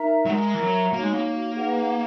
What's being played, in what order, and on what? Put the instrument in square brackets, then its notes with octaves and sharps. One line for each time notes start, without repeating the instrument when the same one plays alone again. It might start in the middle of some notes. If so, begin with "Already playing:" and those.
Already playing: [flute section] D#4 A#4 E5 A#5
[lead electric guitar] F#3
[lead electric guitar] G#3 [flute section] A#4 E5 A#5
[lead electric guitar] E3
F#3
[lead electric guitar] A#3 [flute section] D#4 F#4 C#5
[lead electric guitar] G#3
A#3
[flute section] D#4 G#4 B4 F#5